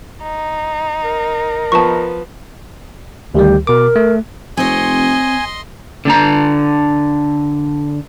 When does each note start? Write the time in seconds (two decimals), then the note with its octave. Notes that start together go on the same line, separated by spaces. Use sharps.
0.22 D#4
1.04 A#4
1.72 F3 B3 B4 A5 C#6
3.35 D2 D#3 G3 G4
3.67 B2 A#4 D6
3.96 A3
4.57 F1 C4 C#5 D#5 G#5 C6
6.05 D3 D4 A#5